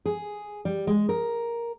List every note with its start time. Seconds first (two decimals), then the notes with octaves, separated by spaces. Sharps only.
0.06 G#4
0.65 G3
0.87 G#3
1.09 A#4